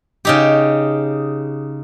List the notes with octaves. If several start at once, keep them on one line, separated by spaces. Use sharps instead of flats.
C#3 D#4 G4